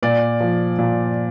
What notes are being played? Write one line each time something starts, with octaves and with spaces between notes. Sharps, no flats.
A#2 D5
F3
A#2